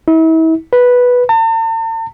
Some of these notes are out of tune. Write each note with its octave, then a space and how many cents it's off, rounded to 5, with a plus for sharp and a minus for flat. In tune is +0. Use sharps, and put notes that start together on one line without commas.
E4 -40
B4 -5
A5 +45